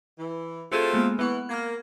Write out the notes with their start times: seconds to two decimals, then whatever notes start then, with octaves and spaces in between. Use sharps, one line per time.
0.18 E3
0.72 A3 C4 F4 F#4 G#4 A4
0.93 G#3 A#3 B3
1.19 E3 B3 F#5 C#6
1.49 A#3 F6 G#6